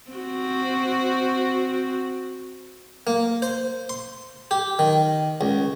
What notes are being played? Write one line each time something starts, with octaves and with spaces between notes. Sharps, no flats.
C4 F#4
A#3
C5
C6
G4
D#3
C#2